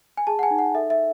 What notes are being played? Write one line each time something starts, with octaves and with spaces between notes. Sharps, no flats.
G#5
G#4 A5
F#5
G#5
D#4
F#5
A4 E5
E5